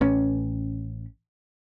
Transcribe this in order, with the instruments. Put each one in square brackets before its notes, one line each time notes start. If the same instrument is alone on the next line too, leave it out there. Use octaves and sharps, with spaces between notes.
[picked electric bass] A1 C#4